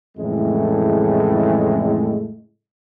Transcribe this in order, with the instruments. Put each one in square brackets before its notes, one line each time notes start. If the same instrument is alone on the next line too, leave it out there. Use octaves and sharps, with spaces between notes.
[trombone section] F2 A2 C#3 E3 G#3 A3